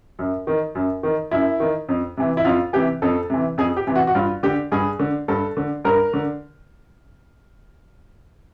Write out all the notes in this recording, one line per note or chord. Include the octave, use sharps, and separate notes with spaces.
F#2
D#3
F#2
D#3
F#2 E4
D#3
F2
C3 E3
E4
F2 F4
C3 E3 G4
F2 A4
C3 E3
F2 G#4
G4
C3 E3
F#4
F#4
G2 F4
D3 G4
G2 G#4
D3
G2 A4
D3
G2 A#4
D3